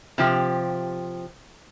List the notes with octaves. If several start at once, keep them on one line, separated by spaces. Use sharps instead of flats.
C3 F3 G4